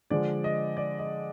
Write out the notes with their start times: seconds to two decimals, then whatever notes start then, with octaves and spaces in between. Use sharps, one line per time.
0.10 D3 F3 G#3 D5
0.44 D#5
0.77 D5
0.99 D#5